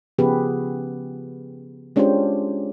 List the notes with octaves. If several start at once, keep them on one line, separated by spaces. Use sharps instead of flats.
C#3 F3 B3 G4 G#4 B4
G#3 C#4 D4 F4 G4 C5